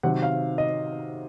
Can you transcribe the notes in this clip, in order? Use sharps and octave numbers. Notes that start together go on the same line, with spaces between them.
C3 D#3 F#3 F#5
F5
D#5